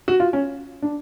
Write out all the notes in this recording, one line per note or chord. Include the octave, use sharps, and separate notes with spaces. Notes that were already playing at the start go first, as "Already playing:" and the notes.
F#4
F4
C#4
D4